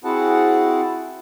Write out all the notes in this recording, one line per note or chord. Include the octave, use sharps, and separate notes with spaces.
C4 E4 F#4 G#4 F#5 A5